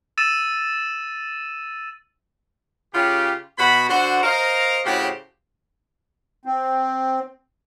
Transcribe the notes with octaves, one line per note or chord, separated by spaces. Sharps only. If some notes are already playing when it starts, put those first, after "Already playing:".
E6 A6 D#7 E7
C#3 F4 G4
B2 F#4 B5
D3 F#4 C5
A#4 C5 D#5 F5
A2 C#3 C4 F#4 G4
C4